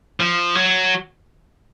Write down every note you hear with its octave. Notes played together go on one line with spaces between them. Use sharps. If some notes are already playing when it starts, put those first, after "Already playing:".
F3
F#3